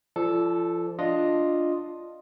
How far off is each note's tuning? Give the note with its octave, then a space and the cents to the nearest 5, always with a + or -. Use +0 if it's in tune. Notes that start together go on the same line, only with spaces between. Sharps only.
F3 -30 A4 +0 D5 -15
D4 +0 F4 +0 D#5 +0